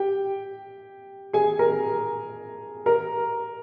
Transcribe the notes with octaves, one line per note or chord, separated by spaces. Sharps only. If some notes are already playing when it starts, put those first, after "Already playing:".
Already playing: G4 G5
G#4 G#5
A#4 A#5
A#4 A#5